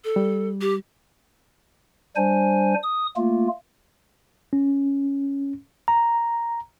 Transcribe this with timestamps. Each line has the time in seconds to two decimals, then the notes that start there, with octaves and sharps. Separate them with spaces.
0.04 A4
0.16 G3
0.61 G4
2.16 G3 D4 C5 G#5
2.83 D#6
3.16 A3 A#3 F4
4.53 C#4
5.88 A#5